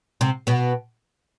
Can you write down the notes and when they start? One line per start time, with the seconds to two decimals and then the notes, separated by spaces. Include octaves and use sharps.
0.21 C3 C4
0.47 B2 B3